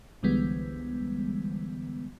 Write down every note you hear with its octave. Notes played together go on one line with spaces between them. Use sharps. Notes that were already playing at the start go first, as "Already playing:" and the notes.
C2 D3 E3 G3 G#3 B3